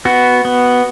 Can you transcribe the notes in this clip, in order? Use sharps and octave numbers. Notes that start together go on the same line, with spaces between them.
B3 F#4
B3